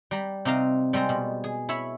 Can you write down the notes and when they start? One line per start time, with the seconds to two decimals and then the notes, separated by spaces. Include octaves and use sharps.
0.11 G3 A#5 B5
0.45 C3 C4 D#4 F5 A#5
0.93 G3 G#3 C4 A#5
1.09 B2
1.44 G#4
1.69 E4 C#5 E5 B5